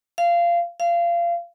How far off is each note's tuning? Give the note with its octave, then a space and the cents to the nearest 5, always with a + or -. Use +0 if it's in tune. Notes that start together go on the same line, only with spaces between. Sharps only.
F5 -20
F5 -25